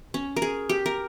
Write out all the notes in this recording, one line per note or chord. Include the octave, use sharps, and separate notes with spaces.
C#4
A#4
G#4
G4
A#4